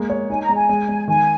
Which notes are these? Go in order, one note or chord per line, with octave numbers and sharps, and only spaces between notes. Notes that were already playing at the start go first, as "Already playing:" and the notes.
Already playing: G#3 A#3
C#5
D#4 G#5
A#5
G#3
G#5
G#3
G#3
D#3 G#5